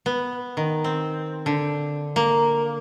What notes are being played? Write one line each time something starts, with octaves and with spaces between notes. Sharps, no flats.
B3
D#3
C4
D3
A#3